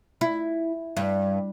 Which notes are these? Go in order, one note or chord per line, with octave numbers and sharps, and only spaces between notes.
E4
G2